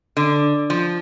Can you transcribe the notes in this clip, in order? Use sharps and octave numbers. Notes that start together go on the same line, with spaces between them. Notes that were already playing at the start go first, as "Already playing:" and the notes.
D3
F3